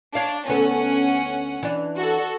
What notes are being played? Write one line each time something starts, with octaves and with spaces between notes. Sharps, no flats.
D4 C#5 F5
D2 B3 C#4 A4 F#5
E3 D4
F#4 A4